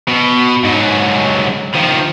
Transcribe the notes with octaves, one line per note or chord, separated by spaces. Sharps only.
B2
G#2 F#3
D#3 F3